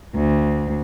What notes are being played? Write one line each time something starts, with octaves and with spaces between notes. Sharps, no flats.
D2